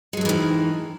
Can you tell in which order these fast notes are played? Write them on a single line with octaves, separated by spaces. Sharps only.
G#3 F#3 F2 E3 D#3